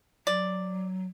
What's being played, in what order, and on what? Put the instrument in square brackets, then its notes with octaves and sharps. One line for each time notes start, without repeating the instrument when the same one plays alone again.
[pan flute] F#3 [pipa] D5